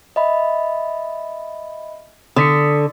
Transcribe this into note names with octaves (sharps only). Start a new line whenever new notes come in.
D#5 E5 B5
D3 D#6 B6 C#7